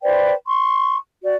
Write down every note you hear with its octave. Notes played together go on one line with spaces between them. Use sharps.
B4 C5 D5 G5
C6 C#6
F#4 D5